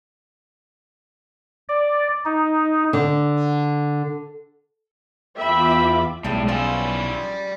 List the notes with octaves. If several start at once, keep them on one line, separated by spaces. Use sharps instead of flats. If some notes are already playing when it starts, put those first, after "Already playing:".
D5
D#4
D3
E2 F4 E5 G5 B5 D6
B1 A2 G3 G#3
F3 C#4 E4 F4 G#4 D5 G5